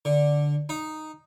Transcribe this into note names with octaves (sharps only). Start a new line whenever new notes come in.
D3
D#4